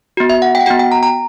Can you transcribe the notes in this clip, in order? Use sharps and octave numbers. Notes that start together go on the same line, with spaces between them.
B3 F#4
E5
F#5
G5
F#5
B3 F#4 G5
G5
A#5
A#5